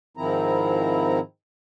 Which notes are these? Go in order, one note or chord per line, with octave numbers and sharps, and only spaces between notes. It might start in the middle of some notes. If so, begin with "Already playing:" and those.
G#2 D#3 F3 C4 E4 A#5